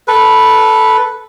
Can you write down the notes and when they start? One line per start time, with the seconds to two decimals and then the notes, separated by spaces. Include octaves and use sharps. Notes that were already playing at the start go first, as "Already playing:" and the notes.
0.08 A4 B4